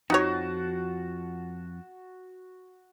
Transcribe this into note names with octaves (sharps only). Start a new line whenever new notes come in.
F2 F3 D#4 F#4 C#5 A5